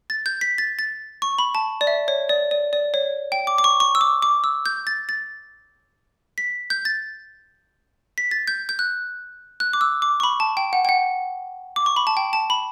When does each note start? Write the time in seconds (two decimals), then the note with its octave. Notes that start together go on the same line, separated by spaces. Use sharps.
0.10 A6
0.26 G6
0.41 B6
0.58 A6
0.79 A6
1.22 C#6
1.38 B5
1.55 A5
1.81 D5
1.87 E5
2.08 C#5
2.29 D5
2.51 D5
2.73 D5
2.94 C#5
3.32 G5
3.47 D6
3.58 D6
3.64 C#6
3.80 C#6
3.95 E6
4.01 D6
4.22 D6
4.44 E6
4.66 G6
4.87 A6
5.09 A6
6.38 B6
6.70 G6
6.85 A6
8.18 B6
8.31 A6
8.47 G6
8.69 G6
8.79 F#6
9.60 F#6
9.73 D6
9.81 E6
10.02 D6
10.20 C#6
10.23 B5
10.40 A5
10.57 G5
10.73 F#5
10.85 G5
10.89 F#5
11.76 D6
11.86 C#6
11.96 B5
12.07 A5
12.17 G5
12.33 A5
12.50 B5